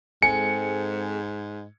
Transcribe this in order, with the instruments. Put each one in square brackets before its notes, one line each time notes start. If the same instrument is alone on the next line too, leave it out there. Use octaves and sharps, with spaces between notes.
[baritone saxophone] G#2 [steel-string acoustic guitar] G#3 C4 A4 [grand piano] G#5 [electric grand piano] C#7